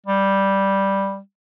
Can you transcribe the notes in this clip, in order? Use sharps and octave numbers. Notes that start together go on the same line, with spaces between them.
G3